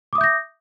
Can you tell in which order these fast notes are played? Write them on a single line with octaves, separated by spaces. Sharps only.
D6 D#6 E5 G6 A#6